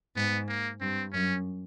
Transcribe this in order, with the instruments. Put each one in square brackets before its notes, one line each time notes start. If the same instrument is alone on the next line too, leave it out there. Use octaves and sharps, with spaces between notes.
[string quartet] G#2 [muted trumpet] B3
[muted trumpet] A#3
[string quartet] G2 [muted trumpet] C4
[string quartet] F#2 [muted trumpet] C#4